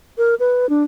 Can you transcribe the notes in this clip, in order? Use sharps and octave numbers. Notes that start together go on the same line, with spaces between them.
A#4
B4
D4